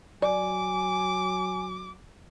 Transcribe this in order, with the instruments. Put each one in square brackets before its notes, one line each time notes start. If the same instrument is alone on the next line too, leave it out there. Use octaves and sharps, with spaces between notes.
[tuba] F#3 [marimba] D5 [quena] G#5 [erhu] D6